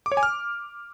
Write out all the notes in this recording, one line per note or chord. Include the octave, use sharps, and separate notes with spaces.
D6
C#5
G#5
F6